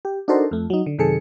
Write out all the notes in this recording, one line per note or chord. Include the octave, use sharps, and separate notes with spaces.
G4
D4 D#4 F#4 A4 A#4 C5
F2 A3
F#3 D#4
D3
F#2 C3 D#3 G#4 A4 C#7